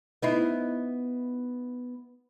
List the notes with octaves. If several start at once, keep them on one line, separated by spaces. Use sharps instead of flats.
B3 D#4 E4